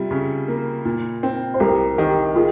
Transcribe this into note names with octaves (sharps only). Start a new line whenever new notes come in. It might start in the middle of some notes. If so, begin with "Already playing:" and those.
Already playing: C3 G3 F4
C#3
A#3
A#2
C4
C5
C2 G4 A#4
D#3 G4 A#4
F4 G#4